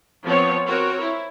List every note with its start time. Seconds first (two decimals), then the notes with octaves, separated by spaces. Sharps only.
0.23 F3 B3 C4 C#5
0.65 C4 F#4 A#4 C#5
1.00 E4